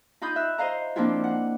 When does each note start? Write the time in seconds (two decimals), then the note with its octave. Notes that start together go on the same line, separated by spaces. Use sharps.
0.22 D#4 F4 B5 D#6 G6
0.36 E5 F#6
0.58 C5 D#5 F5 A#5
0.96 F3 A#3 C4 D4 E4 F4
1.24 F#5